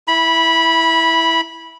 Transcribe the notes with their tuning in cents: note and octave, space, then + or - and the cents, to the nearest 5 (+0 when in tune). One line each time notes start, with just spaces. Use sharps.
E4 +0 B5 -15